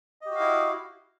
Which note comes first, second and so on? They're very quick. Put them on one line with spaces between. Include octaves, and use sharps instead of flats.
D#5 G4 F#4 F5 E4